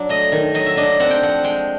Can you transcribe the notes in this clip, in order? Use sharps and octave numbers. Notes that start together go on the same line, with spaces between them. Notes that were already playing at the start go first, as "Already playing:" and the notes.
Already playing: F#3 D4
A3 D#5
D#3
F#3 D#5
E5
D4 D#5
C4 F#5
G5
F3 F#5
G#3 G5